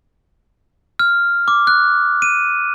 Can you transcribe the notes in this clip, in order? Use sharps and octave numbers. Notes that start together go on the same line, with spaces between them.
F6
D6
F#6
D#7